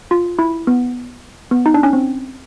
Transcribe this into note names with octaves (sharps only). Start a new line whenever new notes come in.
F4
E4
B3
B3
D#4
D4
C#4
C4